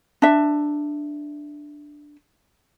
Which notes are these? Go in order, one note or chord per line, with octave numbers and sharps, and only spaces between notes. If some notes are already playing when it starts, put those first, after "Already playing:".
D4 E5